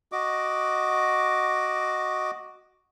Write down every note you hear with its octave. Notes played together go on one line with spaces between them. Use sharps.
F#4 D#5 D6